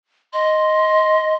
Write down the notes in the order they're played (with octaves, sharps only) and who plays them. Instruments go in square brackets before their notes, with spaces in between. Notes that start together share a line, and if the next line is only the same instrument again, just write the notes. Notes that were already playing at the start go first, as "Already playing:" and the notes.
[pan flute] D#5 [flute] C6